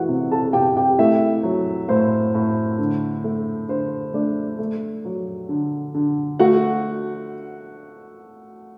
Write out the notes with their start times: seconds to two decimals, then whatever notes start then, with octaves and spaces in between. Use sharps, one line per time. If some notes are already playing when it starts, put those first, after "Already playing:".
Already playing: E3 A3 E4 F#4 F#5
0.08 C3
0.31 A4 A5
0.53 C3 G4 G5
0.76 G4 G5
0.98 A3 E4 E5
1.43 F#3
1.89 A2 C5
2.34 A2
2.78 D3
3.24 A3
3.69 D3 C5
4.14 A3 D4 D5
4.59 A3
5.05 F#3
5.49 D3
5.94 D3
6.39 A3 F#4 F#5